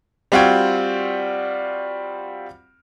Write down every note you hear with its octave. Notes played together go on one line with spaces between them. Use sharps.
G3 C4 F4 F#4 G5 G#6